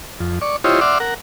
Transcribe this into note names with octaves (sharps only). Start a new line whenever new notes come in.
F2
D5 C#6
E4 F4 G4 C5 C#5 D#5
D5 E5 F#5 C6 D6 F6
A#4 F#5